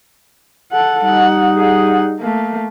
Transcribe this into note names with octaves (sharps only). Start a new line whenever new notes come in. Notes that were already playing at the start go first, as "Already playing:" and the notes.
A4 F#5
G3 D#4 F#5
G#4 F#5
A3 A#3